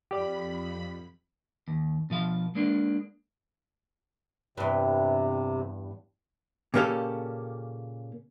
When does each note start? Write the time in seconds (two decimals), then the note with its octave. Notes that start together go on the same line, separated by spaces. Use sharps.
0.11 F2 G4 D5 B5
1.68 D#2
2.10 B2 F3 F5
2.55 G#3 A#3 D4
4.58 E2 G2 C3
6.74 A#2 C#3 A#3 C#4 G4 A4